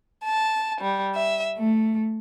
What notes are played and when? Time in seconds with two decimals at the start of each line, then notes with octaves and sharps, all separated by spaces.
0.24 A5
0.81 G3
1.16 E5
1.57 A3